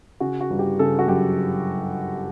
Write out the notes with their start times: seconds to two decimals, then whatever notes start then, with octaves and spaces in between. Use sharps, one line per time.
0.20 C#3 F#4
0.41 F#4
0.50 G1
0.59 G4
0.79 C#3 A4
0.99 F#4
1.08 F#2 G4